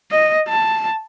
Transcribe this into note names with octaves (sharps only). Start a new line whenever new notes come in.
D#5
A5